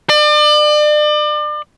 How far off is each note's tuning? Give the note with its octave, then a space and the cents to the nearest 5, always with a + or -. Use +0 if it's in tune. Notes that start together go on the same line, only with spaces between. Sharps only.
D5 +35